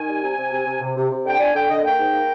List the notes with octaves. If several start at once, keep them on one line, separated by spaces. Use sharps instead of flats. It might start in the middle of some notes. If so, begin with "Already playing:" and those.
Already playing: D#3 G#5
G3
C3
C3
C3
C3
C3
C3
C3
D3 G5
D4 G#5
D3 G5
D3 D#5
A#3 G5
G#2
A#3